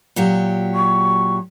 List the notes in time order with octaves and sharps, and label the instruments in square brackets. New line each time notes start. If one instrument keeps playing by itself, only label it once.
[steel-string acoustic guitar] A#2 F#3 G4
[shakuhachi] C#6